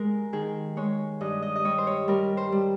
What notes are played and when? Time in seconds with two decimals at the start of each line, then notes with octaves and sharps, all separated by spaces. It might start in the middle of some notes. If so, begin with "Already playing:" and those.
Already playing: G#3 A#4
0.33 D#3 G#4
0.77 G#3 C#5
1.21 G2 D#5
1.42 D#5
1.56 D#5
1.64 G3 C#5
1.78 C5
1.87 C#5
2.08 G3 A#4
2.37 C5
2.52 G3